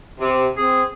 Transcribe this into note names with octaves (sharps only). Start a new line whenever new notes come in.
C3
C4 G#4